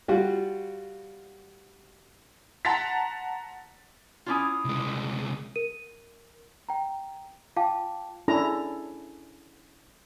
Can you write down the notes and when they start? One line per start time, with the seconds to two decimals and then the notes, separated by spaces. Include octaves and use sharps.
0.08 G3 F4 F#4
2.65 F#5 A5 A#5 C6 A6 B6
4.26 C#4 E4 F4 C#5 D6 D#6
4.65 C2 G#3
5.56 A#4 D#7
6.69 G5 A#5
7.56 F4 F5 G5 A5 D6
8.28 C#4 D4 E4 G#4 A4 A#5